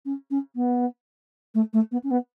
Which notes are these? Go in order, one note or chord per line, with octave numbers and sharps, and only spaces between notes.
C#4
C#4
B3
A3
A3
B3
C#4
B3